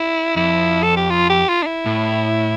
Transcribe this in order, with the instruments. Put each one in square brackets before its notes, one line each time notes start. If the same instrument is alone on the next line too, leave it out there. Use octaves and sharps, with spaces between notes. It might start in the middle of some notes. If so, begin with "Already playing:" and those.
Already playing: [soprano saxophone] E4
[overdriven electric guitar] F2 [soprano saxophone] E4
[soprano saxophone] A4
G4
F4
G4
F4
D4
E4
[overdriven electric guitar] A2